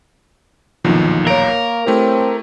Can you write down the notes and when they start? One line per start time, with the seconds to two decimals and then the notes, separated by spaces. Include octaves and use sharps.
0.84 B1 E2 A#2 D#3 F3
1.27 A#3 A#4 C#5 D7
1.87 A3 C4 E4 G4